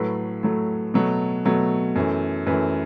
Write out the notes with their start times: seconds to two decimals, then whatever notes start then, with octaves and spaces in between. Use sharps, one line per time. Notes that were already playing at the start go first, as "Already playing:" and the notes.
Already playing: A2 F#3 A3 B4
0.43 A2 F#3 A3
0.94 B2 F#3 A3
1.45 B2 F#3 A3
1.96 F#2 E3 A3
2.47 F#2 E3 A3 B4